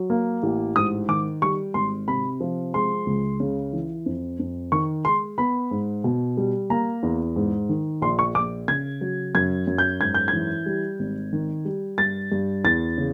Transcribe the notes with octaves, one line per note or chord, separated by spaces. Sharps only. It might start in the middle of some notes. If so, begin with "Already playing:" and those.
Already playing: F#3
A#3
A1
G#2 D#6
D#3 D6
G3 C#6
G#1 C6
C3 B5
F3
G#3 C6
C#2
C#3
E3
F2
F2
D#3 C#6
G#3 C6
B3 B5
G#2
B2
G3
A#3 A#5
E2
G#2
D#3
A#1 C6
C#6
A#1 D6
C#3 G#6
F#3
F#2 G#6
F#2
G6
G#2 G#6
G6
E3 G#6
G3
G#1
D#3
G3
G2 A6
G2
E2 A6
C#3